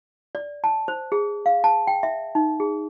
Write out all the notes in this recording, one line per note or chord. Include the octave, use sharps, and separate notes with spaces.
D5
A5
C5
G#4
F5
A5
G5
E5
D#4
G#4